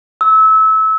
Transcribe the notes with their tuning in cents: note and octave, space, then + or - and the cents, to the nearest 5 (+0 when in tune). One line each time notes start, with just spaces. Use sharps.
E6 -25